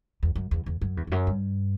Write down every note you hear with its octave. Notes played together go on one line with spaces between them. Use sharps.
E2
F#2
E2
E2
F#2
E2
E2
F#2
G2